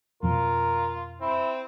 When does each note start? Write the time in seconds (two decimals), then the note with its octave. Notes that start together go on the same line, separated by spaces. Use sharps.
0.23 F2 B2 F3 F4 A#4
1.22 C4 E4